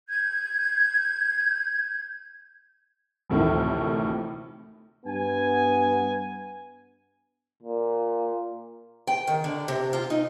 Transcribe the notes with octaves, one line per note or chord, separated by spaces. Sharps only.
G6 G#6
A1 D2 A2 C3 D#3 F3
G2 B3 G#5
A#2
G5
D#3
D3
C3
F4
D#4